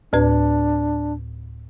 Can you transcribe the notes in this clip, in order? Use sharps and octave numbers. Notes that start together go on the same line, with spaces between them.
D2 A2 D4 B4